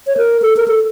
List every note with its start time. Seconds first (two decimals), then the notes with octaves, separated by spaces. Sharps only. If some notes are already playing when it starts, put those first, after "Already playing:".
0.07 C#5
0.17 A#4
0.42 A4
0.57 A#4
0.68 A4